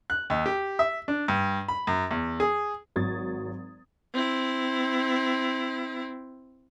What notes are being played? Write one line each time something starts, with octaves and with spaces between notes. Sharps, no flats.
F#6
D#2
G4
E5
D4
G2
B5
F#2
E2
G#4
G#1 F#3 C#6 D#6 G#6 A6
C4 E4